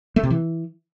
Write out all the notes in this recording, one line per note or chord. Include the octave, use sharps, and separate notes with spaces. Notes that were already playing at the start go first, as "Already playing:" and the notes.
A3
C3
E3